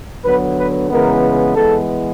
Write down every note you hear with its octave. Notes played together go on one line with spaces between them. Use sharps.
D3 F#3 B3 B4
B4
C#3 E3 G#3 B3 A#4
E3 G#3 B3 A4